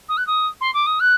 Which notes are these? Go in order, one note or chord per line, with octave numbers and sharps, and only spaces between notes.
D#6
F#6
D#6
C6
D6
D#6
F#6